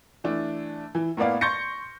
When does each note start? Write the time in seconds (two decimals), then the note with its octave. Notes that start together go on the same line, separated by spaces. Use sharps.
0.24 E3 A3 D4
0.95 E3
1.17 A2 A#3 B3 D5 F5
1.41 C6 C#6 G6 A6 A#6 C#7